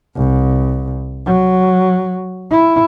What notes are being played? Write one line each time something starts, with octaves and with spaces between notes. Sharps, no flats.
C2
F#3
E4